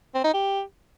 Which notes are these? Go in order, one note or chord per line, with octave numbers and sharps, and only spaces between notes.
C4
D#4
G4